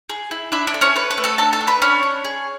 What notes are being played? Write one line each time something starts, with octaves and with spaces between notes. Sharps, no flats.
G#4
E4
D4 E4 E5
D4 D5
A4
C#4 C#5
A4 B4
B4
A3
A4 A5
D4 A4 A5
A4 A5
D4
B4 B5
C#4 D4 C#5
D4
G#4